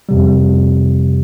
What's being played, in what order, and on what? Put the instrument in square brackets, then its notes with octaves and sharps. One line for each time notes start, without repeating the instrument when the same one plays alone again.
[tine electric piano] F2 C3 G3